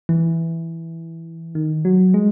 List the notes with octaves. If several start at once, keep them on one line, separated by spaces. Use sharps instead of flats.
E3
D#3
F#3
G#3